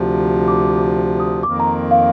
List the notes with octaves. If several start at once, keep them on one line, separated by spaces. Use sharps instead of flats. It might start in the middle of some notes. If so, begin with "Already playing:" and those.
Already playing: D2 C3 F3
D6
D#6
F2 D#3 A#3 D6
A#5
F5